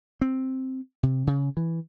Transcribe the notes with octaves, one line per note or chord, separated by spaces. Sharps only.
C4
C3
C#3
E3